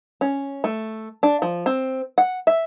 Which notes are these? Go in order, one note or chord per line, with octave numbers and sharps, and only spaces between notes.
C#4
A3
D4
F3
C4
F#5
E5